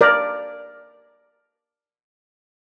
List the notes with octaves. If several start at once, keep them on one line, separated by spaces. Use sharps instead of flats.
A#4 D5